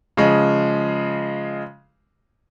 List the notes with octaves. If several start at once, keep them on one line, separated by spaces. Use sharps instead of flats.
C#3 F3 G#3